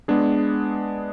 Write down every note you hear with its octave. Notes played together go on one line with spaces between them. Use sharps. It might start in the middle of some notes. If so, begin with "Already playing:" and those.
G#3 B3 D4 G#4